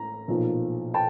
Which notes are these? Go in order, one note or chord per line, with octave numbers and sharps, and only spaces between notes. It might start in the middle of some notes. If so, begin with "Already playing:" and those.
Already playing: A1 A2 A#5
B1 A#2 F3
G5 A5